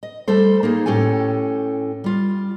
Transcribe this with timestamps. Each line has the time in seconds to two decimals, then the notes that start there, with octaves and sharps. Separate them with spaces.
0.03 D#5
0.28 G3 A3 A4 C5
0.63 A#3 D#4 G#4
0.86 A2 C#4 G4 A4 G#5
2.04 G3 F4